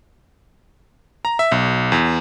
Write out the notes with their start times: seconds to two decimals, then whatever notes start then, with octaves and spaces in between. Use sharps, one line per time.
1.25 A#5
1.39 E5
1.52 B1
1.92 E2